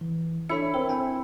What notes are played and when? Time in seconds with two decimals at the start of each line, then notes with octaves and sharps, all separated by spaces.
0.01 E3
0.49 D4 E4 A4 C#5 C#7
0.74 C4 A#4
0.89 G5 G#5